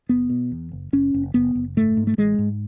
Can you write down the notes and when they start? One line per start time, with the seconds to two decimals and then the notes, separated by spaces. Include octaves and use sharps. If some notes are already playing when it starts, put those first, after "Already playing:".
0.09 F#1 B3
0.30 B2
0.51 E2
0.72 F#1
0.93 F#1 C#4
1.14 F#1
1.34 F#1 B3
1.55 F#1
1.77 G#2 A3
1.97 G#2
2.07 A3
2.18 A1 G#3
2.39 G#2